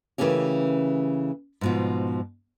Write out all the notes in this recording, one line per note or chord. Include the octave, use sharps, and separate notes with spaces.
C#3 E3 A3 A#3 C#4 G4
G#2 B2 F3